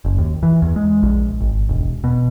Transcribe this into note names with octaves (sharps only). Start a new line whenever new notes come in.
F#1
D#2
E3
E2
G#3
A#1
G#1
E1
B2